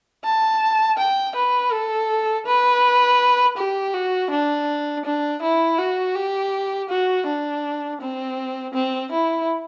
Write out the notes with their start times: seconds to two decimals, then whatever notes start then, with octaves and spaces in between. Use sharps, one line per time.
0.24 A5
0.98 G5
1.36 B4
1.72 A4
2.47 B4
3.57 G4
3.94 F#4
4.31 D4
5.05 D4
5.42 E4
5.79 F#4
6.15 G4
6.90 F#4
7.27 D4
8.01 C4
8.74 C4
9.12 E4